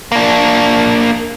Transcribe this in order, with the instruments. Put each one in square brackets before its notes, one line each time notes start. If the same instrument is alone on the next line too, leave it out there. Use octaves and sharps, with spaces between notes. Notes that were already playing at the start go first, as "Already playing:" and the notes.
[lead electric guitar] A#3 D4